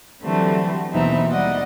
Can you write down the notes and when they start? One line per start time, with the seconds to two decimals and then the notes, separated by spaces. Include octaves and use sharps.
0.22 D3 E3 F#3 G3 A3 C4
0.92 D#2 B2 E3 C4 D#4 E5
1.30 G3 D5 D#5 F#5